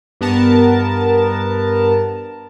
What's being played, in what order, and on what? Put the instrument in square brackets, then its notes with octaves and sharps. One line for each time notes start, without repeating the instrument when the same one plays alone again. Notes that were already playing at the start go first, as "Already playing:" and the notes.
[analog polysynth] G2 B3 A#4 A5